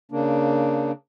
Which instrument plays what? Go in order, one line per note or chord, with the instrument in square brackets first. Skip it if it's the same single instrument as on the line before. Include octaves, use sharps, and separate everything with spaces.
[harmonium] C#3 A#3 D4